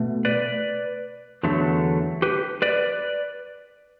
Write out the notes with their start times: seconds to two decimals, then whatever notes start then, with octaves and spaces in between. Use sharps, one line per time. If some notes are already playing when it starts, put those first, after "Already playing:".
Already playing: B2 A3
0.25 B4 D5
1.43 E2 D3 F#3 A3
2.22 G4 B4
2.62 B4 D5